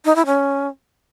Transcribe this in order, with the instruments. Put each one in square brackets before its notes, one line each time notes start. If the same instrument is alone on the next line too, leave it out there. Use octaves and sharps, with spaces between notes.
[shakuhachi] D#4
E4
C#4